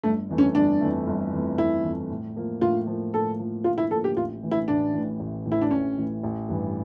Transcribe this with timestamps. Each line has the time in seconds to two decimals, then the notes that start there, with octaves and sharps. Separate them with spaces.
0.03 G1 A3
0.29 F2 E3 A3
0.38 C#4
0.55 G1 D4
0.81 F2 E3 A3
1.07 G1
1.32 F2 E3 A3
1.58 G1 E4
1.84 F2 E3 A3
2.10 A2
2.36 F3 A#3
2.61 A2 F4
2.87 F3 A#3
3.13 A2 A4
3.39 F3 A#3
3.64 A2 F4
3.78 E4
3.90 F3 A4
3.94 A#3
4.04 G4
4.16 A1 F4
4.42 A2 E3
4.51 E4
4.68 A1 D4
4.93 A2 E3
5.20 A1
5.45 A2 E3
5.52 E4
5.62 D4
5.71 A1 C#4
5.97 A2 E3
6.23 A1
6.49 G2 E3